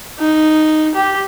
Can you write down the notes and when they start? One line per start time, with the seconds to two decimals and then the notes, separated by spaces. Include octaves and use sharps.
0.19 D#4
0.95 G4